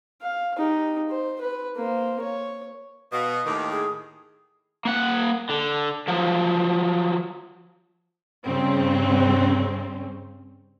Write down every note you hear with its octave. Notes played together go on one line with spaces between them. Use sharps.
F5
D#4 G4
C5
B4
A#3 C5
C#5
B2 F5 D#6
D#2 A2 D#3 D6
G#4 D#6
A#3 F#5
D3
F3 F#3
G2 C#3 C4